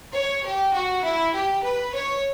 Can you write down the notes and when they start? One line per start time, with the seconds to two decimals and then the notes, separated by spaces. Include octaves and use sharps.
0.14 C#5
0.44 G4
0.73 F#4
1.03 E4
1.33 G4
1.62 B4
1.92 C#5